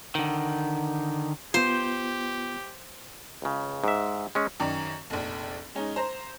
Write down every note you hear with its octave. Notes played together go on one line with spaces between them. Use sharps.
D3 D#3
B3 F4 G4 C5
C#2 C#3
G#2 E5
G#3 C#4
F#2 D#3 D5 A#5
F1 A#1
G#3 C#4 D#4
C5 A#5